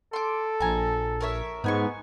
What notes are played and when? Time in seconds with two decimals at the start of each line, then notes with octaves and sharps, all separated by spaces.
0.13 A4 C6 D6
0.60 A#1 G#5 A#5
1.21 A#4 C#5 E5
1.64 G#2 B3 D#4 G#5 C#6